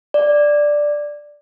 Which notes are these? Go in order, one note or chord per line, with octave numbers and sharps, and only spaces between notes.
D5